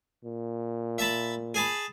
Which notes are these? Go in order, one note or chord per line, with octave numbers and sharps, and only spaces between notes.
A#2
E5 A5 B5
G#4 A5 B5